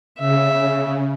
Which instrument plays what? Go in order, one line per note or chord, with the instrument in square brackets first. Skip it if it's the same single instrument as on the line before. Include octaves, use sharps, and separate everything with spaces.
[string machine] C#3 [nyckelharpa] E5